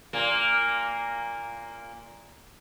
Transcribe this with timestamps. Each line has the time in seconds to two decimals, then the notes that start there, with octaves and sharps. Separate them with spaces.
0.13 A#2 A#3